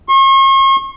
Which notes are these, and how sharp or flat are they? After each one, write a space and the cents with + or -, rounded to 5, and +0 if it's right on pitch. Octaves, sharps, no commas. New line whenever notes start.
C#6 -45